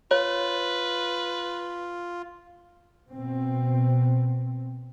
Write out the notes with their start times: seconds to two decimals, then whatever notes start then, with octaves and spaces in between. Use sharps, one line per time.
0.11 F4 B4 C#5
3.10 B2 C4